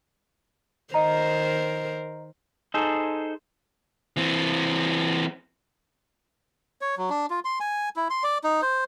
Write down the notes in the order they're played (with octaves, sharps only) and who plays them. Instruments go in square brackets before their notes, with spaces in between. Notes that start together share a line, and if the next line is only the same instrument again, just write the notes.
[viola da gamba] D#3 A#4 C5 [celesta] D#5 A#5
[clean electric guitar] D#4 G#4 A4 C5
[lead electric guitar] E3 C4
[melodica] C#5
F#3
D4
F4
C6
G#5
E4
C6
D5
D#4
C5